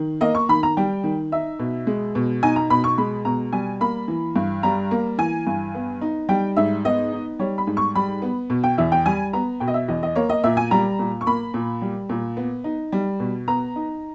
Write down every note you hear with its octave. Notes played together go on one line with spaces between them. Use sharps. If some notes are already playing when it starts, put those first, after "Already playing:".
Already playing: D#3
A#3 D#5
C#6
D#3 B5
A#5
G3 G5
D#3
D#4 E5
B2
G#3
B2
D#4 G#5
A#5
B2 B5
C#6
G#3 B5
B2 A#5
G3 G#5
A#3 B5
E3
G2
G3 A#5
A#3
E3 G#5
G2
B3
D#4
G3 G5
G#2 E5
B3 D#5
D#4
G3 C#5
B5
G#2
C#6
G3 B5
B3
B2
G5
E2 E5
G5
G3 G#5
B3 A#5
B2 G5
D#5
E5
E2 D#5
D#5
A#3 C#5
D#5
A#2 E5
G#5
G3 A#5
A#2
C#6
A#3 B5
A#2
G3
A#2
B3
D#4
G3
B2
B3 A#5
D#4